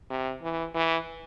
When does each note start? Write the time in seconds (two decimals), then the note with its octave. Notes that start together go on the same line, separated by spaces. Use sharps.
0.10 C3
0.42 E3
0.74 E3